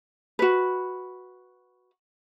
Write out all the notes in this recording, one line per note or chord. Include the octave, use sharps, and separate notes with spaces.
F#4 B4